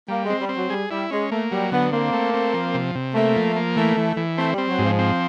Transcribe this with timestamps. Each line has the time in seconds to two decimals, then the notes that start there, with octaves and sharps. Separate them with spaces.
0.08 G3 A#3
0.24 G#3
0.30 C4
0.40 G3
0.49 C4
0.55 F#3
0.69 G3 G#4
0.90 G3 E4
1.11 G#3 C#4
1.31 A3 A#3
1.51 F#3 G3
1.72 D3 B3
1.92 A#3 C4
2.13 A3
2.34 C4
2.54 F3
2.74 C3
2.95 C3
3.15 A3 A#3
3.36 F3
3.56 A#3
3.77 E3 A3
3.97 E3
4.17 E3
4.38 A3 C4
4.52 G3
4.58 C4
4.68 F#3
4.78 G#2 F3
4.99 C4